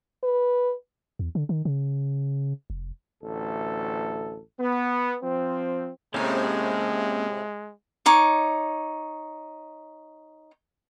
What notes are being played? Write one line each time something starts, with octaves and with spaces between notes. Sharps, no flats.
B4
E2
D3
D#3
C#3
F1
A1 D2 A4
B3
F3 C4
A2 C3 G#3 A#3 C4 C#4
D#4 C#5 D6